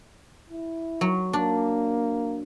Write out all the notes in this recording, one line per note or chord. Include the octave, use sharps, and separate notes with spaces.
E4
F#3
A#3 D4